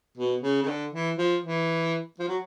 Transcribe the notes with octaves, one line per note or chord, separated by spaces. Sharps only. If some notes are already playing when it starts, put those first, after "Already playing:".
B2
C#3
C#3
D3
E3
F3
E3
F3
F#3